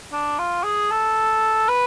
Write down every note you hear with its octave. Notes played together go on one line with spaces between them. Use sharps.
D4
F4
G#4
A4
B4